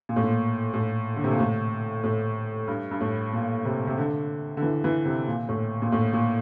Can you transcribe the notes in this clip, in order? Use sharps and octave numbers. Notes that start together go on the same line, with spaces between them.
A#2
A2
A#2
A2
D3
C3
A#2
A2
A2
G2
G2
A2
A#2
C3
C3
D3
D3
E3
E3
C3
A#2
A2
A#2
A2
A#2